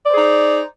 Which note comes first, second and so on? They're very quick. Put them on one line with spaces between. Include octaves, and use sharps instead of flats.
D5 C5 G#4 D#4